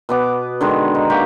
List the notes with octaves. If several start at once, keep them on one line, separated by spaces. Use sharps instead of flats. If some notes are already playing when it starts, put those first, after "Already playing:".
B2 B3 D6
D3 D#3 G#3
D#4
A#3 F#4 G4